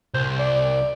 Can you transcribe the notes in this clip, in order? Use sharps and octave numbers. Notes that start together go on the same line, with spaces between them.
C2 C5
D5